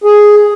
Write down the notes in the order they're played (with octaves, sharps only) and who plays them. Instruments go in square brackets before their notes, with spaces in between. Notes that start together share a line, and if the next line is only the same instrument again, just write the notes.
[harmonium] G#4